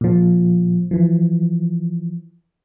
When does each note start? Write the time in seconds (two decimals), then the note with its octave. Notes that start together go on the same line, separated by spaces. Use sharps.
0.01 A#2 F3
0.91 E3 F3